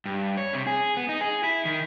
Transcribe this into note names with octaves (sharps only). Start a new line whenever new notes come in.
G2
C#5
C3
G#4
B3
D#4
G#4
E4
D#3